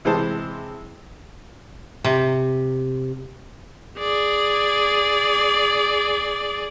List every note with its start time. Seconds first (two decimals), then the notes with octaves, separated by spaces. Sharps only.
0.05 C3 E3 G#3 C5 A5
2.04 C3
3.99 G#4 D5